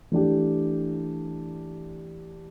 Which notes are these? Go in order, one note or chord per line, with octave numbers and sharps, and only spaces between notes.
E3 A3 D4 G4